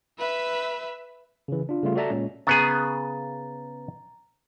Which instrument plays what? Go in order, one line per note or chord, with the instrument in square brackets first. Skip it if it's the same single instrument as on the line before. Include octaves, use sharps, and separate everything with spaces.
[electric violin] B4 E5
[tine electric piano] C#3 E3
D4 F4
C#3 G3 A3 F4
F#4 A4 D5 E5 A5 A#5
A#2 G#3 C#4
[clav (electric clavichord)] C#3 B3 G#4 [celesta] A#5 A6